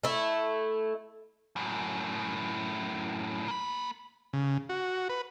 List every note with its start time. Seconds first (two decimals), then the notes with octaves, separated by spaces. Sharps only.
0.04 A3 E4
1.56 F#2 A2
3.48 A#3 B5
4.33 C#3
4.69 F#4
5.09 B4